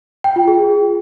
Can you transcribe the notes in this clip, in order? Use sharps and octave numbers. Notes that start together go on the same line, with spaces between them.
G5
F4
G#4